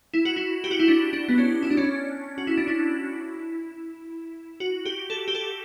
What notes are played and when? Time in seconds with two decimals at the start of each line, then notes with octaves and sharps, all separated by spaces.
0.14 E4
0.25 F#4
0.36 E4
0.64 G4
0.71 F#4
0.79 E4
0.88 D4
1.13 D4
1.28 B3
1.38 C#4
1.63 E4
1.70 D4
1.77 C#4
1.84 D4
2.38 F#4
2.47 E4
2.57 D4
2.67 E4
4.60 F#4
4.86 G4
5.10 A4
5.28 G4
5.35 A4